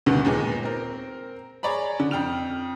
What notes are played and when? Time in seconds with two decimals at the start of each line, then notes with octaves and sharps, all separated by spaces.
0.06 D2 G2 B2 D3 D#3
0.25 D#2 A#2 G#3 B3
0.63 C4 A#4
1.63 G#4 C#5 D5 A#5 B5
2.00 D3
2.11 F2 G5 F6 F7